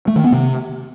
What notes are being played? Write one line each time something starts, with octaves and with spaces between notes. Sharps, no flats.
A3
D#3
B3
C3